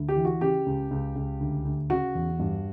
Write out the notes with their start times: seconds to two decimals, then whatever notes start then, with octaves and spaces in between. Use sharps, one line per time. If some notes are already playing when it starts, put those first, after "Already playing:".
Already playing: D2
0.09 G4
0.16 E3
0.25 F#4
0.41 C#3 G4
0.66 C#2
0.91 C#2
1.16 C#2
1.40 D2
1.65 D2
1.90 C#3 F#4
2.15 E2
2.39 G2